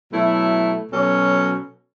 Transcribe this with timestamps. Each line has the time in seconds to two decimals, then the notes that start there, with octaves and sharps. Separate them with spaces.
0.11 B2 F#3 A3 E4
0.91 B2 F#3 C#4 A4 C#5